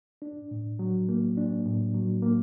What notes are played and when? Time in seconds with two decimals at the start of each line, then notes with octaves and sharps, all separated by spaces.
0.22 D4
0.51 A2
0.79 F#3
1.09 A#3
1.37 D4
1.66 A2
1.94 F#3
2.22 A#3